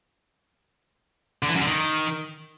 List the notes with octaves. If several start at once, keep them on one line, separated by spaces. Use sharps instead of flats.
D3
E3
F#2
D3
D#3